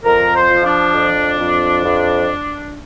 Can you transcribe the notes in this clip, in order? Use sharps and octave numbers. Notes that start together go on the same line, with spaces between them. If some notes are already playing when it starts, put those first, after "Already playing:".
F2 A#4
C5
F3
F4
D4
F2
F2
F2